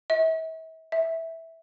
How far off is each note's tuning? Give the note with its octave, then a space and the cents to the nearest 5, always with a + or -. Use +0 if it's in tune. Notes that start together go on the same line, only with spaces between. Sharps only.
E5 -40
E5 -10